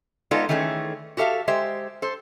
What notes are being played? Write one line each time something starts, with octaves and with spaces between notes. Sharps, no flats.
G#3 B3 D#4 F4 A4 D5
D#3 E3 A3 C#4 G#4
F#4 G4 A4 E5 F5
G#3 G4 C5 E5
A4 C5